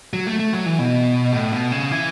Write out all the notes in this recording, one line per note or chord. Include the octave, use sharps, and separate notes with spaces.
F#3
A3
A3
F#3
E3
B2
A2
B2
C#3
E3